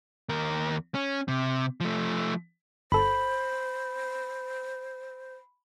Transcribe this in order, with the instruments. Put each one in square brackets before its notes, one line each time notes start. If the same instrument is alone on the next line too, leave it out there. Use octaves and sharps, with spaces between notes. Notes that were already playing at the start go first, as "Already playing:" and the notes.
[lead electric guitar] D#2 A#4
C#4
C3
F3 A3
[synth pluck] G1 A4 [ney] C5 [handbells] B5